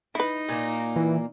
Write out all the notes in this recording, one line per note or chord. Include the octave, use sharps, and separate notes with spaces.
D#4 E4 B4
A#2 A#3
E3